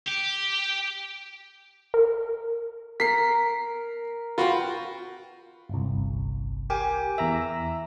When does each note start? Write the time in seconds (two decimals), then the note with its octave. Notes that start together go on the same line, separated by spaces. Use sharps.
0.07 G4
1.94 A#4
3.00 A#4 A#5 B6 C7
4.38 F4 F#4 B4 G5
5.69 G1 C2
6.70 G4 A#4 G5 G#5
7.18 E2 E5 A#5 E6